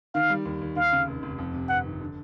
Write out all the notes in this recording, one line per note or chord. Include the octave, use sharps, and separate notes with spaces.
D#3 F5
G3
D#2
D#2
D#2 F5
C#3
F1
F1
F2
C3
G1 F#5
D#3
D3